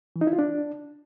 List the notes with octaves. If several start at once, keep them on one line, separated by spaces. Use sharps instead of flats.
E3
D#4
E4
F4
D4